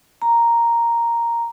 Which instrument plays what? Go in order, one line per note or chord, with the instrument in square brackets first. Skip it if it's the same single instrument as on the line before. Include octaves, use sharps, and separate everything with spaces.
[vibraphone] A#5